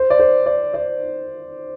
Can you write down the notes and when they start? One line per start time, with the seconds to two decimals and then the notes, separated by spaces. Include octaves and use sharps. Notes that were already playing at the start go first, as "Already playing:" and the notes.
Already playing: C5
0.10 D5
0.19 C5
0.46 D5
0.74 D5